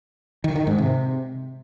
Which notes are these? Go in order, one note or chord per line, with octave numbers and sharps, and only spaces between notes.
D#3
D#3
G#2
C3